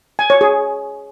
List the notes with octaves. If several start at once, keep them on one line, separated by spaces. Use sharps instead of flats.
G#5
C#5
G#4